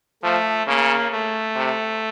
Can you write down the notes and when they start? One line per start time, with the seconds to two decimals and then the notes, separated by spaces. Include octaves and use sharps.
0.23 F3 A3
0.67 C#3 A#3
1.12 A3
1.56 C3